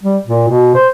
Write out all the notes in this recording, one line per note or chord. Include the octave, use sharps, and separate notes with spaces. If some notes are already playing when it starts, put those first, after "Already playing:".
G3
A#2
B2
C5